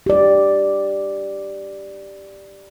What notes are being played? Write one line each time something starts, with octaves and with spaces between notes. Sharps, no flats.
G4 D5